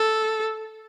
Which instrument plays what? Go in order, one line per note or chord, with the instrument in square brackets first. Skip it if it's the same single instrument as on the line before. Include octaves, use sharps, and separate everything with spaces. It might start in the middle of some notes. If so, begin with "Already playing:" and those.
Already playing: [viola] A4